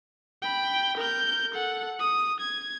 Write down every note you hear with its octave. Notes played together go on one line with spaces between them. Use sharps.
G5 B5
A#4 G6
A4 F#5
D#6
G#6